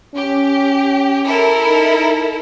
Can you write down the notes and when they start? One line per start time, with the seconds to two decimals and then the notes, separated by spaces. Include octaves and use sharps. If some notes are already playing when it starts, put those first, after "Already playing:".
0.15 C#4 G4
1.26 E4 A4 A#4
1.68 D#4